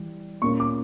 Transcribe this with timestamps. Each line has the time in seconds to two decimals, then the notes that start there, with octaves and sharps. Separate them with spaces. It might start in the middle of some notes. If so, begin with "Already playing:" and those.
Already playing: E3 G3
0.42 A#2 A#3 C#4 C#6
0.60 D6